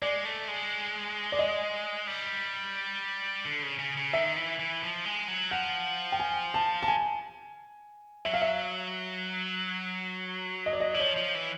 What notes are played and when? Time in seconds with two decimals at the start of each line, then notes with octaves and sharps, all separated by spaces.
0.02 G#3 D5
0.25 A3
0.48 G#3
1.32 D5
1.39 D#5
2.07 G3
3.45 D3
3.62 C#3
3.79 C#3
3.97 C#3
4.13 D#3 E5
4.36 E3
4.59 E3
4.82 F3
5.05 G#3
5.28 F#3
5.51 F3 F#5
6.12 G5
6.20 G#5
6.54 A5
6.83 A5
6.88 G#5
8.25 F#3 E5
8.34 F5
8.42 E5
10.66 D#5
10.73 D5
10.80 D#5
10.93 E3 D5
11.00 F3 C#5
11.16 F3
11.35 E3